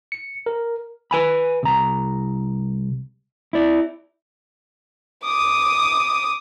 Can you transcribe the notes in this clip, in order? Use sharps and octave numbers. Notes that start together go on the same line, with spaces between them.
C#7
A#4
B4 G#5 B5
C2 A#5
E4 D5
D6 D#6